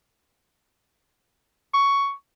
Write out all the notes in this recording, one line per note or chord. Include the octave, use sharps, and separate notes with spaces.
C#6